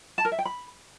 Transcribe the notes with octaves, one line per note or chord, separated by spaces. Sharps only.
A5
A#4
E5
G5
B5